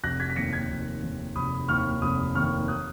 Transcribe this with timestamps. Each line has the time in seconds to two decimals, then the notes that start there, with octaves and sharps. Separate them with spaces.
0.03 F1 F#6 A#6
0.20 G#6 B6
0.30 B6
0.36 D#2 D#3 A#6 C#7
0.53 G#6 B6
0.70 F1
1.02 D#2 D#3
1.36 F1 B5 D#6
1.68 D#2 D#3 C#6 F6
2.02 F1 B5 D#6
2.35 D#2 D#3 C#6 F6
2.68 D#6 F#6